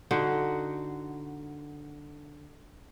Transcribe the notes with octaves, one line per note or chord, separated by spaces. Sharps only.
D3 D#4 F#4